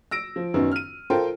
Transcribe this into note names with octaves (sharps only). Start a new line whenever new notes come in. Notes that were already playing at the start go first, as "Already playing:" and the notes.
E6 A#6 D7
F3
F#2 D#3 B3 C#4
F6 D#7
F4 A4 A#4 C5 G5